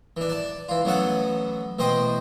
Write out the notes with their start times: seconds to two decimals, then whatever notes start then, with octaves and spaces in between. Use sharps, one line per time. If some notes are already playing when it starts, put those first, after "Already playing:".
0.17 E3 D4
0.29 D5 A5
0.68 E3 F4
0.85 A1 F#3 B3 A4 F#5
1.79 A1 B2 C5 D#5 G5 C6